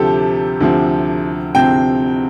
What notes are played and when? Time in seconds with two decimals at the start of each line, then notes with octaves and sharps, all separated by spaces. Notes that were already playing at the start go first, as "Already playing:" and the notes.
Already playing: D2 C3 F3 C4 G4 A4
0.60 D2 C3 F3 C4
1.55 D2 C3 F3 C4 G5